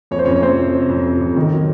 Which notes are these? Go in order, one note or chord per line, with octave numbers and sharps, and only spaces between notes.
F2 C#5
C5
F2 C#4 C#5
C#5
C3 C4 C5
C3
C3
F2
C3
F2
D#3
F#3